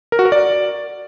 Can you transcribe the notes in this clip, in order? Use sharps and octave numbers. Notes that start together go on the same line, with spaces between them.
A#4
F#4
A#4
D5